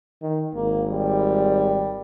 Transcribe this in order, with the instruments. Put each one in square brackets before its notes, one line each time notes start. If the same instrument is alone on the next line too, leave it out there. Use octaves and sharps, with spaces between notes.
[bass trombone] D#3
[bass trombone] G#1 [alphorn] A#3
[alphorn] G3